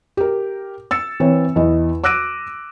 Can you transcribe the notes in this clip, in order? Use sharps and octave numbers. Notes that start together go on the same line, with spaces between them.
G4 A#4
E6 A6 C#7
E3 C4 C#5
E2 E4 D#5
D6 E6 F#6 A#6 D7 D#7